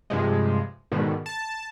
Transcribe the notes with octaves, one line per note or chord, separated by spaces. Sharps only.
G2 C3 F3 G#3
G#2 B2 D3 D#3
A5